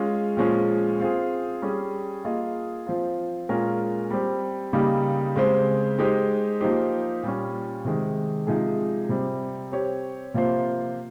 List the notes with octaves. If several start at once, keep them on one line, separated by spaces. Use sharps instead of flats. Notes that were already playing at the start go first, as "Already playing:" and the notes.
Already playing: G#3 C#4 F4
A#2 F3 G#3 C#4
C4 F4 G#4
G3 C#4 G#4
A#3 F4 G#4 D#5
F3 C4 F4
A#2 G#3 C#4 F4 A#4
G3 C4 G4
C#3 G3 A#3 D#4 G4
C#3 G#3 C4 G4 C5
G#3 D#4 G4 C5
F3 A#3 D#4 G4 C5
A#2 G3 C#4
C3 D#3 G#3
C3 F3 G#3 D#4 G#4
C3 G3 C4
C4 G4 C#5
C3 F3 A#3 F4 C5